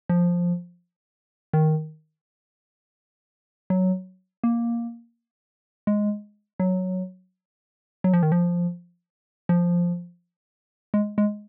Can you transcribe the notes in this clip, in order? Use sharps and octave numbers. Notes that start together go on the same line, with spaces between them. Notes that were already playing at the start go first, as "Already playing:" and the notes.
F3
D#3
F#3
A#3
G#3
F#3
F#3
F3
D#3
F3
F3
G#3
G#3